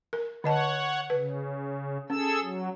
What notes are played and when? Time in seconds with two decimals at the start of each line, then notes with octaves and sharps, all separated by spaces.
0.13 A#4
0.44 D3 C#5 D#5 F#5 A5
1.10 C#3 B4
2.10 C#4 G#4 A4 E6
2.42 F#3